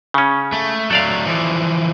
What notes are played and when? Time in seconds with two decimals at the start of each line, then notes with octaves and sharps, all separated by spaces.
0.14 C#3 C#4
0.52 A3
0.91 F#3 A3 A4 D5 F5
1.27 E3 F3